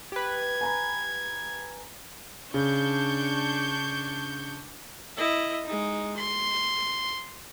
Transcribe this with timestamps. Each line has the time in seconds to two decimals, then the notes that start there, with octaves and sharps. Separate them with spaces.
0.12 G4 B4 G#6
0.61 G#5 A#5 B5
2.54 C#3 D4 C#6 G6
5.17 E4 D#5
5.65 G#3 D#4
6.17 C6